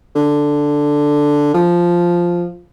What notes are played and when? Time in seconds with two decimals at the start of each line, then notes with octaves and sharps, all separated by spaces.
0.15 D3
1.54 F3